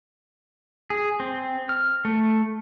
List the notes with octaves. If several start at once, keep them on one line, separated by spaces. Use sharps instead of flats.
G#4
C4
F6
A3